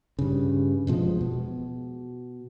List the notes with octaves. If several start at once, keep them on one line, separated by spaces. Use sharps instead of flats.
G2 C#3
E1 B2 F3 G#3
B2